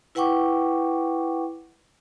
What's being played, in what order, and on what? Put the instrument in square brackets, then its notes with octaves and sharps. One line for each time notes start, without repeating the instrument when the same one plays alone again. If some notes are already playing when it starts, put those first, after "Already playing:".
[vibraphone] E4 B4 F#5 G5 C#6 D6